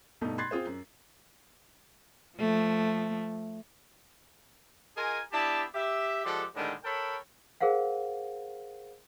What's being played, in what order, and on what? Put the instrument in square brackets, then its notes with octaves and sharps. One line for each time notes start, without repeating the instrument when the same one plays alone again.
[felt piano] G2 B2 A3 B3 D#4
B5 C6 F#6 G#6 A6 C7
C4 F4 G#4 C5
F#2
[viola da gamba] F3 A3
[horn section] F4 G#4 A#4 D#5 G#5
B3 D4 E4 G4 A5
G4 E5
F3 G#3 G4 A4 D5 F#5
A2 D3 D#3 G3 G#3
A4 A#4 C#5 G5 A5 B5
[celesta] G#4 A#4 C5 F5 F#5